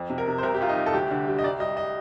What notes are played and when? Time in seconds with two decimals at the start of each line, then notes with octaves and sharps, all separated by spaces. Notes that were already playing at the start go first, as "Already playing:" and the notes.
Already playing: F2
0.10 C3
0.18 A#4
0.27 C3
0.38 C5
0.43 C2 A#4
0.54 G4
0.60 C2 F4
0.69 D#4
0.77 C2
0.86 A4
0.93 D2 G4
1.11 D3
1.28 G3
1.39 D#5
1.43 C2 D5
1.60 G3 D#5
1.77 D#5